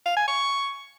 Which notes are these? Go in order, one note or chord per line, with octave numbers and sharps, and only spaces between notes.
F5
G#5
C#6